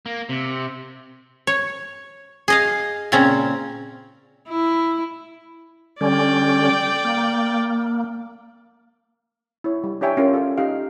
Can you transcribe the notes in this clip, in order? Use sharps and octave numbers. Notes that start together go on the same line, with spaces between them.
A#3
C3
C#5
G#4 D#5 F5
A#2 C#3 C4 C#4 A#5
E4
D3 G3 C#4 D5 G5
A#3
E4 C#5
G3
D4 G4 C#5 E5 G5 G#5
C#4 F4 A#4
F4 A4 D5
D#4 G4 F5